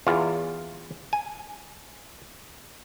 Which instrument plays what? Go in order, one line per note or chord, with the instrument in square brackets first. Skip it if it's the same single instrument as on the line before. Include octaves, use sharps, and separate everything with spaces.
[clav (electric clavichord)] E2 F4
G#5